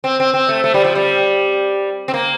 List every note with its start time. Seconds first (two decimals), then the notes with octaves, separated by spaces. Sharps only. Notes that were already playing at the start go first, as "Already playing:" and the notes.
0.04 C4
0.20 C4
0.34 C4
0.49 A3
0.64 A3
0.74 G3
0.84 F3
0.95 G3
2.08 C4
2.14 A#3